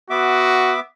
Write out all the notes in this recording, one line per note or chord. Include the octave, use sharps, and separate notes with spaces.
B3 F#4 E5 D6